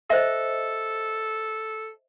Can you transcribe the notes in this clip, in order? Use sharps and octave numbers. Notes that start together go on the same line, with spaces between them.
A4 C5 D#5 E5